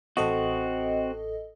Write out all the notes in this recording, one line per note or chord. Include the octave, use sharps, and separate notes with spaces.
A1 C4 F#4 A4 D#5